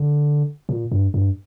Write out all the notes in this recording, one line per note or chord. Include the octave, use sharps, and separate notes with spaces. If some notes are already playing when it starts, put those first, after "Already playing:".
Already playing: D3
A#2
G2
G2